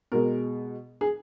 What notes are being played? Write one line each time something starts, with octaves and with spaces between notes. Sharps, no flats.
B2 G#3 A#4
G#4